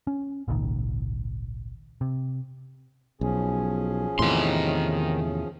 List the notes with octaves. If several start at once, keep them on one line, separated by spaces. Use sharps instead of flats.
C#4
G#1 C#2 A#2 D#3
C3
B1 F3 C#4 G#4
E2 A2 C3 D#3 C6